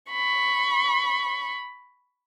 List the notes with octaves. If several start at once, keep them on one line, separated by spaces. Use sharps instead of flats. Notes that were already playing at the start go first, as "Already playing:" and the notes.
B5 C#6